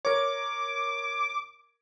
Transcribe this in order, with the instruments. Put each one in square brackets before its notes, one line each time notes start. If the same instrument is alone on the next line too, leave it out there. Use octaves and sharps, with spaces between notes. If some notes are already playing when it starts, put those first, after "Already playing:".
[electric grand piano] A#4 C#5 [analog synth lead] D6